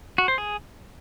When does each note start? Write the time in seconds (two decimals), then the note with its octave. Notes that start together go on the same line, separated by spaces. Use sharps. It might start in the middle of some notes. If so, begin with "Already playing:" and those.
0.18 F#4
0.28 C5
0.38 G#4